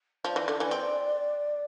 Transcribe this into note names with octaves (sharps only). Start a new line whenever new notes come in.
F3 D5
E3
D3
E3
C4